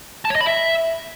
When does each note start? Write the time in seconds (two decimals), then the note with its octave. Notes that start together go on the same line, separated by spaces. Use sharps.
0.25 A5
0.30 C#5
0.35 D#5
0.41 B5
0.46 E5